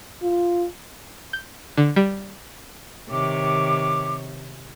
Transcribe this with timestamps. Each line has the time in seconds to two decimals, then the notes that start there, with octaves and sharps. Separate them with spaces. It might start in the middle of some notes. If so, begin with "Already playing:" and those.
0.22 F4
1.33 G6
1.77 D3
1.96 G3
3.10 C3 D#3 C#5 D6